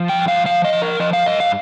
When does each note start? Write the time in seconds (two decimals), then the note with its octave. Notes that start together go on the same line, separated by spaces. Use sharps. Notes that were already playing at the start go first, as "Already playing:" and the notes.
Already playing: F3
0.09 G5
0.19 G2
0.28 F5
0.45 F3 F5
0.65 D#5
0.73 F3
0.82 A#4
1.00 F3 D#5
1.13 F5
1.26 G2 D#5
1.40 F5